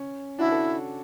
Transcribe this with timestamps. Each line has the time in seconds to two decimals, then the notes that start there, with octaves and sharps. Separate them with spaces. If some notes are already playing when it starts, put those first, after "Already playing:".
Already playing: C#4
0.39 D4 E4 F#4
0.52 A4